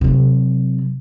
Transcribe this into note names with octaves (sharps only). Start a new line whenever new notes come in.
C3 F#3